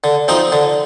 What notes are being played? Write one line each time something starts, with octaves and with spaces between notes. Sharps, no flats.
D3
F3 C4 D#4
D3